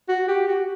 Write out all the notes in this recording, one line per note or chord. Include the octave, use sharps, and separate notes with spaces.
F#4
G4
F#4